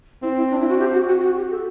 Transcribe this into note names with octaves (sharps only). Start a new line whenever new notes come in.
C4 E4
E4
D4
E4
F#4
G4
F#4
F#4
F#4
G4
A4